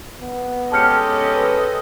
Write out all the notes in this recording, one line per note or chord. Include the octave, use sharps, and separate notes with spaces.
B3
G#3 C#4 G4 A4 D#5 A5 F6 C#7
B4